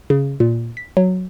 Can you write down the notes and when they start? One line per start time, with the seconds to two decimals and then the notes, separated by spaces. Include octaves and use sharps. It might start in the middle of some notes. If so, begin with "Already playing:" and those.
0.10 C#3
0.40 A#2
0.77 B6
0.97 F#3